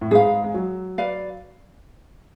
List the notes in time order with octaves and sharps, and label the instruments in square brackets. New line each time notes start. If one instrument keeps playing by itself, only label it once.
[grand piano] A2
[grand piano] G#2 [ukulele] G#4 B4 F5
[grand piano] G#3
F#3
[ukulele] B4 D5 F5